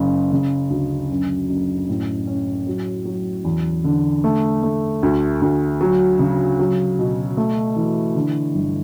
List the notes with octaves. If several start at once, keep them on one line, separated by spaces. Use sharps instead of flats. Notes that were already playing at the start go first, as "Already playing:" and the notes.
Already playing: F#1 C#3
C#3
D2
F#2
F#1
A2
C#4
F#3
F#3
E2
D3
A3
A3
D2
D2
F#3
C#3
F#3
B2
A3
E3
D3
G1